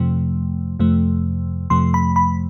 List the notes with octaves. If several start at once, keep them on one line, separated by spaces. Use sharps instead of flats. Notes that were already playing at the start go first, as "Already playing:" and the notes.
Already playing: F2 C3 F3 A3
F2 C3 F3 A3
F2 C3 F3 A3 C6
B5
B5